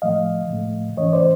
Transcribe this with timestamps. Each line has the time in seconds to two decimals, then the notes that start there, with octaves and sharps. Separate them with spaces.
0.02 A2 F3 A3 D#5 F5
0.49 A2 F3 A3
0.97 G#2 E3 A3 C#4 C#5 D#5
1.13 C5 D5